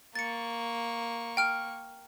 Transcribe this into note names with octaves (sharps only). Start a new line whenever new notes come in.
A#3 C#6 A6 C#7
G5 F6 D7